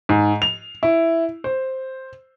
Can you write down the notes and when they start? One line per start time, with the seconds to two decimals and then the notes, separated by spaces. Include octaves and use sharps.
0.09 G#2
0.42 F7
0.83 E4
1.44 C5